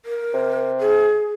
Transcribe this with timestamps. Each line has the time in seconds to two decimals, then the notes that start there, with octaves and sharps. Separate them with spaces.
0.05 A#4
0.34 C3
0.79 G#4